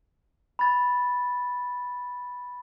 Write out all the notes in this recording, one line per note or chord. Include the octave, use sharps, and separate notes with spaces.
B5 A6